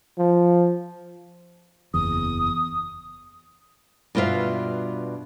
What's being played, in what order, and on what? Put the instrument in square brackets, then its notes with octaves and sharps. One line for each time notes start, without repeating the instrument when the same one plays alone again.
[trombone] F3
[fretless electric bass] F#1 E2 [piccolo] D#6
[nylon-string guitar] G2 B2 F4 B4 E5 F5